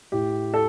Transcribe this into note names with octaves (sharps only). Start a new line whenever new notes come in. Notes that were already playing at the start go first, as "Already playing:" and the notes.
A2 G4
A4